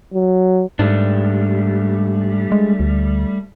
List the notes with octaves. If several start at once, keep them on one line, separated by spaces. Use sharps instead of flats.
F#3
G#2 G3 A3 D4
G#3
D2